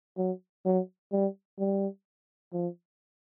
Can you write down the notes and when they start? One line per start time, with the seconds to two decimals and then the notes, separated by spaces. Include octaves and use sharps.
0.18 F#3
0.65 F#3
1.12 G3
1.59 G3
2.53 F3